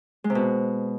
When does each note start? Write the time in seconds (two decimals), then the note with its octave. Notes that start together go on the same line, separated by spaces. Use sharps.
0.24 G#3
0.30 C3
0.35 B2